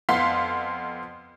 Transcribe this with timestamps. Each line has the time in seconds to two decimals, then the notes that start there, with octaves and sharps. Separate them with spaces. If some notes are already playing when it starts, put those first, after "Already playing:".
0.09 F2 B3 F5 F#5 C6 B6